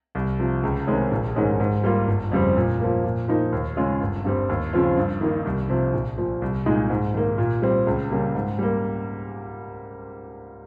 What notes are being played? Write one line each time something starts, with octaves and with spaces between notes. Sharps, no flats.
C2
C3 F3
C#2
C3 D#3 G#3 C#4
A#1
G#2 D#3 G#3 C#4
G#2
G3 A#3 F4
G1
F2 C#3 G3 C4
A#2
F3 A#3
A#2
F3 A#3 D#4
D#2
C#3 G#3 C#4 F4
G1
G2 G3 C4
D#2
C#3 F3 C4 F4
G2
D#3 A#3 D#4
C2
C3 F3
A#1
A#2 F3
C2
A#2 G#3 D#4
G#2
D#3 A#3
A#2
G3 C4
C#2
C#3 G3 A#3
G#2
G3 A#3